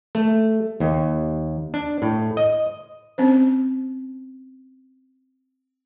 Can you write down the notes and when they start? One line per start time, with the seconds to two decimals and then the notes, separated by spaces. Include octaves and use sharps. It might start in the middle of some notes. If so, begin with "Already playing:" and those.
0.15 A3
0.80 D#2
1.74 D4
2.02 A2
2.37 D#5
3.18 C4 C#4 C5